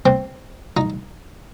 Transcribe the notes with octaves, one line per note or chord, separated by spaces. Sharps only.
C4
D#4